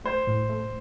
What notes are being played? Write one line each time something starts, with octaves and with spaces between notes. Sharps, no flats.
A3 C5
A2
A3